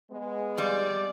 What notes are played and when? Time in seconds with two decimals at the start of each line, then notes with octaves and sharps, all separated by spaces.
0.11 G#3 B3
0.57 F2 G3 D5